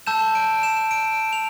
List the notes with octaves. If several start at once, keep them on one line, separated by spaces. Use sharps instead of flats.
A5 E6 G6 E7
D7
E7
D7
F7